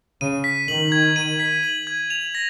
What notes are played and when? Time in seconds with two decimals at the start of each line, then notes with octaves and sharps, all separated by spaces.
0.21 C#3 D#7
0.44 B6
0.68 D#3 F#7
0.92 G#6
1.16 D#7
1.40 B6
1.63 F#7
1.87 G#6
2.10 F7
2.35 A#6